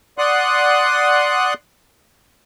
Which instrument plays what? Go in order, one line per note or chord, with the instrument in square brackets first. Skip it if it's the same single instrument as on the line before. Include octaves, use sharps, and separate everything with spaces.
[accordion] D5 F#5 C6 D#6 F#6